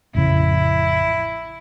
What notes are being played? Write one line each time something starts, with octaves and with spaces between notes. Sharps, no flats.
A1 F2 C#3 E4